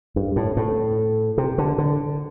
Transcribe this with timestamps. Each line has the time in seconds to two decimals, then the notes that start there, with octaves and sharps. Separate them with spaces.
0.16 G2
0.36 A2
0.57 A2
1.38 C3
1.58 D3
1.78 D3